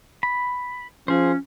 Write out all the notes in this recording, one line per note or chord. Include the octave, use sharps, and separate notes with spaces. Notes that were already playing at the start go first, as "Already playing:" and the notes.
B5
F3 C#4 G#4 C5